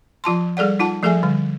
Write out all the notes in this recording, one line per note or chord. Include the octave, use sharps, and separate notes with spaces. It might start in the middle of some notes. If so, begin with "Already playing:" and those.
F3 F4 A5 C6
G3 G#4 A4 D5 F#5
D#4 F4 F#5 A5
F3 A3 G#4 A4 E5 G#5
D3 G3